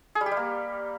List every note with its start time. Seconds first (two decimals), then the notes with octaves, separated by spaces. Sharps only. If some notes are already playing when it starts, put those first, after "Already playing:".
0.15 G#4
0.21 G3
0.26 G4
0.31 G3
0.37 A#3